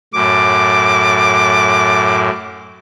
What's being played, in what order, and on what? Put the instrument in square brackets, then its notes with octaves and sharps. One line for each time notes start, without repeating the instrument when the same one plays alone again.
[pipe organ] F#2 A2 [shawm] D6